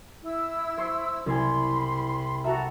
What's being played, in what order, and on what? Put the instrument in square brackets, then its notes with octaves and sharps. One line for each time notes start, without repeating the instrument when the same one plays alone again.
[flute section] E4 E6
[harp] C5 C#6 C7
[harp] C2 C5 G#5 [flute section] B5 C6
[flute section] F#4 A4 A#5 [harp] E5 F#5